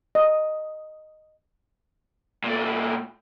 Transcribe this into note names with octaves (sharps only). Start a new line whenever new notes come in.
D#5
A#2 A3